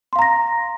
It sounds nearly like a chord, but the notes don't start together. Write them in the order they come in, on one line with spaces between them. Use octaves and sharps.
C6 F5 A#5 A#6